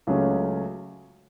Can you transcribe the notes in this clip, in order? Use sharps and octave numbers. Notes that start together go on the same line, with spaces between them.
C#2 C#3 F#3 A3 C#4